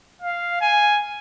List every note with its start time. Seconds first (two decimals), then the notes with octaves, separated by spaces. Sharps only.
0.22 F5
0.61 G#5